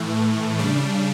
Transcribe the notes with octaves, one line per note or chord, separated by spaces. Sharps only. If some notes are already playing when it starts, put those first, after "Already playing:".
Already playing: A2 E3 A3
C#3 G3 D4